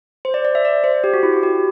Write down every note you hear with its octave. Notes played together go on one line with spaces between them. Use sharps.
C5
D5
D5
E5
D5
C5
G4
F#4
E4
F#4
G4